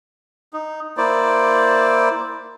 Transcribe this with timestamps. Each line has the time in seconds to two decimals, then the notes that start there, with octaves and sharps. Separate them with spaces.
0.53 D#4
0.97 A#3 E4 C5 D5